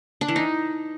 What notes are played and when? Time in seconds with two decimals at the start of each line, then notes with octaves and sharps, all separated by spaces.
0.21 D4
0.28 E3
0.36 D#4